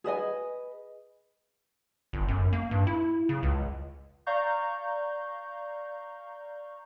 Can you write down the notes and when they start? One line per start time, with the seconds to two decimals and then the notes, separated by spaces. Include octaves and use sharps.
0.04 G#4 B4 D#5 G#5
2.13 G1
2.28 F#2
2.53 A#3
2.71 G2
2.87 E4
3.29 C#3
3.43 C#2
4.26 D5 F5 A#5 C#6 G6